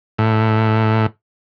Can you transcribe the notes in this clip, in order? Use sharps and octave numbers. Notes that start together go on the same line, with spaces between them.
A2